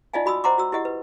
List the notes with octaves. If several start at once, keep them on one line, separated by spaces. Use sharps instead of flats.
D#4 F4 D5 D#5 F5 G#5
F#4 B5 D#6 E6
C5 D#5 F#5 A#5 C6 D6
F#4 E6
E4 G4 D#5 F#5
B4